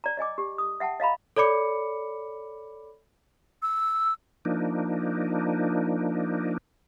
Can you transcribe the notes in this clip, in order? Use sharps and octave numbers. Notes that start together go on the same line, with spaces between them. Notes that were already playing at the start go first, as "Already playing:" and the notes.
D5 A#5
D5 D#5 G#5 D6
G4
D#6
E5 F#5 G5 A5
D#5 F5 A#5 B5
A4 C#5 D5 B5 D6 C#7
E6
F3 A#3 D4 D#4